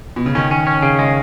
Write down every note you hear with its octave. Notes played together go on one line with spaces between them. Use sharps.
B2
C#3
D#3 C#4
C#4
C#4
C#3
G#3